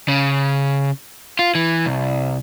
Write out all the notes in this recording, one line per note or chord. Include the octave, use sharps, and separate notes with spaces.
C#3
F4
E3
C2